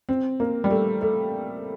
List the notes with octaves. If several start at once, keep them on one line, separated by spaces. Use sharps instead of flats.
C4
A#3
G3
A3
A3